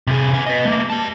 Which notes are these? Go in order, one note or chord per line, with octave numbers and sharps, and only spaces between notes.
C3 G#4
B3 G#5
B4 D#5
A3 A#3
G4 A5